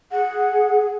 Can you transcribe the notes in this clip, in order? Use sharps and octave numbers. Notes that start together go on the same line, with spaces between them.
G#4 F#5